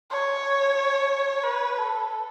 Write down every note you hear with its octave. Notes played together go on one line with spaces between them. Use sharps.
C#5
B4
A4